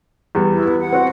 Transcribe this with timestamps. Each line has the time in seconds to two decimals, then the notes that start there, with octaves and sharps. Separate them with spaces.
0.35 E2 G3
0.52 E4
0.66 B3
0.80 F#5
0.93 C4 F#4 C5